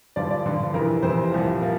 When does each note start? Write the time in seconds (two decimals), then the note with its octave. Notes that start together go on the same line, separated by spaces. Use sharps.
0.16 G2 D3 F3 D5
0.30 D5
0.45 G2 D3 F3
0.74 F2 C3 E3 A#4
1.03 F2 C3 E3 C5
1.31 C2 A#2 F3
1.60 A#2 F3 A#4